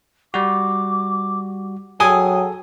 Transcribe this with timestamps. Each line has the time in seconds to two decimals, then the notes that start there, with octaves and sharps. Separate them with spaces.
0.34 G3 F#4 D6
2.00 F#3 G#4 A4 G5 G#5 D#6